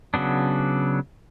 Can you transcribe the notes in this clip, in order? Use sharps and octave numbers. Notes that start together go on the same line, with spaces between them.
C#3 F#3 B3 D4